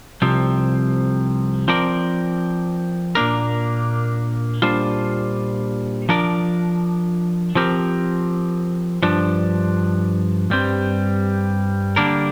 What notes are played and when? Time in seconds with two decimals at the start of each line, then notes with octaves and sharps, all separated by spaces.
0.22 C2 C3 F3 C4
1.68 F3 C4 A#4 D5
3.15 A#2 A#3 D4 A#4
4.62 A#2 G3 D4 F4 C5
6.09 F3 D4 A#4 D5
7.55 F3 C4 G4 A#4
9.03 G2 F3 D4
10.50 G2 G3 C4
11.96 D3 G3 A#3 D4 A#4